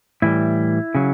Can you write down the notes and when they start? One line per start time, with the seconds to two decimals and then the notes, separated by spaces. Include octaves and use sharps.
0.22 A2 E3 G3 E4
0.95 C#3 F#3